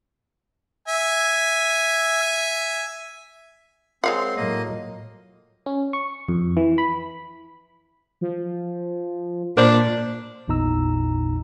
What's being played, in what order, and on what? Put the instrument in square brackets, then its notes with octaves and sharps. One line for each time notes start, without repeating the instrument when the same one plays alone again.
[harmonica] E5 G#5
[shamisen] G#3 F5 F#5 [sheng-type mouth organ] C4 C6 [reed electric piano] F4 A#4 C#5
[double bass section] A2 F#3 [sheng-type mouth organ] A#3 D#5
[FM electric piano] C#4
C#6
F2
E3
B5
[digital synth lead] F3
[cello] A#2 [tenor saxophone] D4 [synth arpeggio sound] A#4 C5
[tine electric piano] A1 E2 A#2 D#4 A#5 E6